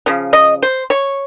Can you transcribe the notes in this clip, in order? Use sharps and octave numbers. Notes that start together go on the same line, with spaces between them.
C#3 F3
D#5
C5
C#5